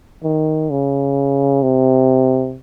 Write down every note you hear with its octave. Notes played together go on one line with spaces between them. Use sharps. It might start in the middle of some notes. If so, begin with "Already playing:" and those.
D#3
C#3
C3